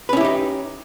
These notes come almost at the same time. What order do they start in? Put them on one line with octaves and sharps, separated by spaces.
B4 C#4 E4 G4 D#4